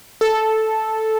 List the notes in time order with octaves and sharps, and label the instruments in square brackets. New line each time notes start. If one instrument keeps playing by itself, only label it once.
[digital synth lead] A4